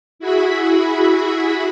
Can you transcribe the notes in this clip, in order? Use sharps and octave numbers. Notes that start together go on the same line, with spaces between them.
E4 F#4 G#4 E5 B5